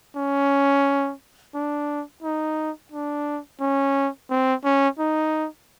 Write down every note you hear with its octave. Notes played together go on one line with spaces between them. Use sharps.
C#4
D4
D#4
D4
C#4
C4
C#4
D#4